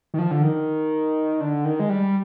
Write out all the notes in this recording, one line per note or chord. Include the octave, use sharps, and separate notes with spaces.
D#3
F3
D3
D#3
D3
D#3
G#3
G3